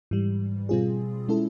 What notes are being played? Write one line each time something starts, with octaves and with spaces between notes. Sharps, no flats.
G#2 E3 G3
B2 G3 C4 F4 G#4
G#3 C#4 E4 A4